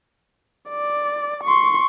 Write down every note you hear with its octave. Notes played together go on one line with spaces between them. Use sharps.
D5
C6 C#6